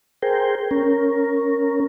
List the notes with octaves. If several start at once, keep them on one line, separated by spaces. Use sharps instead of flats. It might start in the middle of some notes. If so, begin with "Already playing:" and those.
G#4 A#4 C5 G5
C#4 A#4